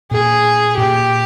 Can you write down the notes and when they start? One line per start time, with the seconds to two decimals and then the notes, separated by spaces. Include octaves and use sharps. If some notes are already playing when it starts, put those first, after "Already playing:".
0.11 A#2 G#4
0.78 A#2 G4